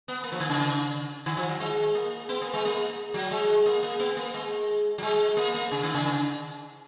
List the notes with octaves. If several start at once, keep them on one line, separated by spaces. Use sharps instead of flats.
B3
A#3
F3
D#3
C#3
D#3
F3
F#3
G#3
A#3
B3
A#3
G#3
A#3
F#3
G#3
A#3
A#3
B3
A#3
G#3
F#3
G#3
A#3
A#3
C#3
D#3
C#3